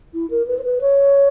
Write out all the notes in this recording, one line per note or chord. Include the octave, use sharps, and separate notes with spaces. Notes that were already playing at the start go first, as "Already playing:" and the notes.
E4
A#4
B4
C5
B4
C#5